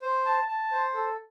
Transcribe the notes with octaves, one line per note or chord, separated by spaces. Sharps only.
C5
A5
A5
C5
A4